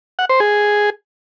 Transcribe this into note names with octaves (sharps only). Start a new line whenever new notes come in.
F#5
C5
G#4